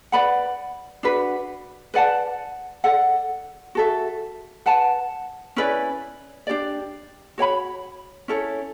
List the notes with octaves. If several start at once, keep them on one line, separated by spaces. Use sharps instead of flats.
B4 D5 F#5 B5
D4 F#4 B4
B4 D5 F#5 A5
A4 D5 F#5
F#4 A4 E5
B4 F#5 A5
C#4 E4 B4 D5
D4 G4 D5
F#4 C#5 G5 B5
C#4 E4 A4 C#5